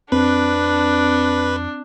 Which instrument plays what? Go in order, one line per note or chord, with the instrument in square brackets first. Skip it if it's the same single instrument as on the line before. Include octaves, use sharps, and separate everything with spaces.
[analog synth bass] F2 [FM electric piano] C4 [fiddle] D4 [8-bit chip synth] B4